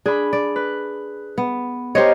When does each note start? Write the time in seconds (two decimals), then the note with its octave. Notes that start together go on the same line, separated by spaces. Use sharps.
0.06 D4 G#4 B5
0.33 D5
0.56 B4
1.38 B3
1.95 G4 A#4 C5 C#5 D#5